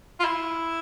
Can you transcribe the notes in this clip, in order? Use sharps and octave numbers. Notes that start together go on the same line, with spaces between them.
F4
E4